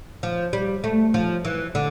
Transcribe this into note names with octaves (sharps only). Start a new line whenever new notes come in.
F3
G3
A3
F3
E3
D3